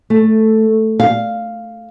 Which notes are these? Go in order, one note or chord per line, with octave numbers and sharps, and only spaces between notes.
A3
F5